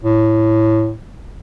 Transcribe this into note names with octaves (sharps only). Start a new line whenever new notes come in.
A2